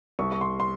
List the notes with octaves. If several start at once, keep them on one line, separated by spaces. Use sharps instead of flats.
C2 C#6
C#6
C6
C6